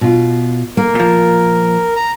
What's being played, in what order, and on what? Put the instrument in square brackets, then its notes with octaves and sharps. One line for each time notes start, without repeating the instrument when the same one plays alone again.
[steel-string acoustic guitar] B2 F4
[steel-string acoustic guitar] A#3 [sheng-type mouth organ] A#4
[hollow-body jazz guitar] A#2 F3
[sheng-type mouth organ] A#5